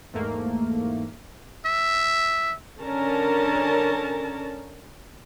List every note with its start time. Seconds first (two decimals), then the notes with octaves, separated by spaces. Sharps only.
0.14 E2 G#2 A3 A#3
1.66 E5
2.82 D3 C#4 A#4 A5